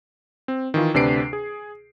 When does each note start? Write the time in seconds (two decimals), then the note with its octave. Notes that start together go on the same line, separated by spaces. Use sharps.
0.48 C4
0.74 D#3 E3 F4
0.94 D2 C3 D4 B4 C7 D7
1.33 G#4